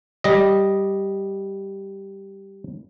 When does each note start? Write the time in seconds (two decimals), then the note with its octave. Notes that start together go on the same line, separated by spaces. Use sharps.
0.24 G3 D#5